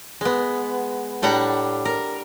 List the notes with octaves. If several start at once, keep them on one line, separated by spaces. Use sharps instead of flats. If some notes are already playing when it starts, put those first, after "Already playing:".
G#3 B3
A2 G3 D4 F#5 A#5
A#4